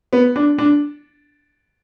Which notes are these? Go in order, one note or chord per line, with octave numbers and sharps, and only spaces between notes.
B3
D4
D4